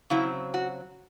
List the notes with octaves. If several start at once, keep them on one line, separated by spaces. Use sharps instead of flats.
C#3 F#3 C4 E4
F#4